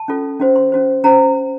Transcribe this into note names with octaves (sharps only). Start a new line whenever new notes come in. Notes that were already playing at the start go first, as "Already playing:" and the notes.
Already playing: A5
C#4 F4 A4
C#4 F#4 C5
C6
C#4 F#4 C5
C#4 F#4 C5 A#5